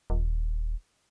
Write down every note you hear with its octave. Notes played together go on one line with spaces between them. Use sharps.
D#1